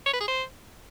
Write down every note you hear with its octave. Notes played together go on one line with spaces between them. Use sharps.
C#5
B4
G#4
C5